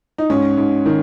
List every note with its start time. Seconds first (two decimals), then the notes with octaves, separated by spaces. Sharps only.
0.18 D#4
0.30 G#2 C#4
0.57 G#2
0.86 D#3